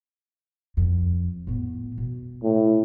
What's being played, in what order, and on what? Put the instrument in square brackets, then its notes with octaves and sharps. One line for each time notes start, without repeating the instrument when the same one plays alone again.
[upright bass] F2
A2 B3
B2
[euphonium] A2